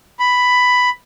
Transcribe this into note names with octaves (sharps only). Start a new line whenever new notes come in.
B5